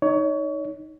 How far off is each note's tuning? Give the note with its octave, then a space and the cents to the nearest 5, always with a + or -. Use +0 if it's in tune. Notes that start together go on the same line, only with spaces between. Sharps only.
D#4 +0 C#5 +25